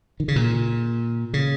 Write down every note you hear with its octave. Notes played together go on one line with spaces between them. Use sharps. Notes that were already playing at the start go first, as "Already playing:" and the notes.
D#3
C#3
A#2
C#3